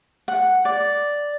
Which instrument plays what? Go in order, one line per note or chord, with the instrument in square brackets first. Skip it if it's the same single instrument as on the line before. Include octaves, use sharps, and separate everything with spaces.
[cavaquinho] F#5
D5